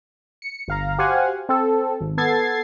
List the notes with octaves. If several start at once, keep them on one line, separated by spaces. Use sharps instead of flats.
C#7
G1 F5 A#5
F#4 G4 C5 F5 F#5 G#5
C4 A4
G#1
B3 A4 G#6 A6 C7